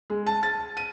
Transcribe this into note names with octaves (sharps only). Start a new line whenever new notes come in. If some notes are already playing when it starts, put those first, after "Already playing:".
G#3
A5
A6
D#7